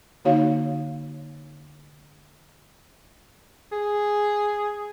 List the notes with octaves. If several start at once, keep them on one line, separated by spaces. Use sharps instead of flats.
D3 A#3 D#4 F#4 C#5 F5
G#4